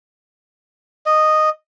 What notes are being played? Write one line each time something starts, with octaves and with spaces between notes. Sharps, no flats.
D#5